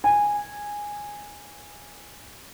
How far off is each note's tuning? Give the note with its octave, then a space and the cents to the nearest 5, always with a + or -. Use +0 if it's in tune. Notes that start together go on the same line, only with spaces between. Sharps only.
G#5 -10